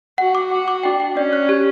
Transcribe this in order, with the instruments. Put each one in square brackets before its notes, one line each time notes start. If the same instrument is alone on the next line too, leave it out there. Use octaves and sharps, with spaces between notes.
[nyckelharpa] F#4 [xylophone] F#5
[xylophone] D6
[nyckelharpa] F#4 [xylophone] F#5
[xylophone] D6
[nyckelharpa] D4 [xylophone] G5
[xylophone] G5
[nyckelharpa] C#4 [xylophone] D5
[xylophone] F#6
G4